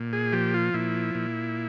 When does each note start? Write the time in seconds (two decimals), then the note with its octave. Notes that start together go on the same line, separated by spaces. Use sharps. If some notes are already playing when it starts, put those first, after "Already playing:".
Already playing: A#2
0.13 G#4
0.33 F3 G4
0.54 F4
0.74 A#2 E4
1.15 A#2